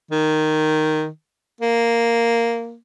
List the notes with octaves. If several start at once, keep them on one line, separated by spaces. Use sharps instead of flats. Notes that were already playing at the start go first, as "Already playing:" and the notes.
D#3
A#3